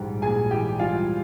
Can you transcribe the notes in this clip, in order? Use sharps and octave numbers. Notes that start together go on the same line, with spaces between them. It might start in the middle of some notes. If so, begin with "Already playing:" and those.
Already playing: A#1 G#2 E3 G3 G5
A#1 G#4 G#5
E3 G4 G5
G3 F4 F5